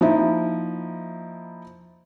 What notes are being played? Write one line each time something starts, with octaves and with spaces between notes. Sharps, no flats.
F3 A#3 D#4 E4